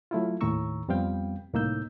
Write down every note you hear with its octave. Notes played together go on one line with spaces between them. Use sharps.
F#3 A3 E4 F4
D#2 A2 D#3 A#5 C#6 E6
F2 G3 B3 C4 F5 G5
C2 A2 A#3 D#4 E6 G6